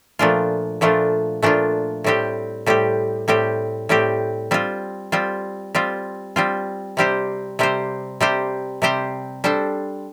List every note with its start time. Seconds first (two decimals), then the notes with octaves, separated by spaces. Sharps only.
0.19 A#2 F3 A3 D4 F4
0.81 A#2 F3 A3 D4 F4
1.42 A#2 F3 A3 D4 F4
2.04 A2 G3 C4 G4
2.66 A2 G3 C4 G4
3.28 A2 G3 C4 G4
3.89 A2 G3 C4 G4
4.51 G3 C4 F4
5.12 G3 C4 F4
5.75 G3 C4 F4
6.36 G3 C4 F4
6.97 C3 G3 C4 G4 C5
7.59 C3 G3 C4 G4 C5
8.21 C3 G3 C4 G4 C5
8.82 C3 G3 C4 G4 C5
9.44 G3 D4 A4 C5